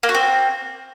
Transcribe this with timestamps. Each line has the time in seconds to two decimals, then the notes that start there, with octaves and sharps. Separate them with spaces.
0.03 A#3
0.09 F#4
0.14 C4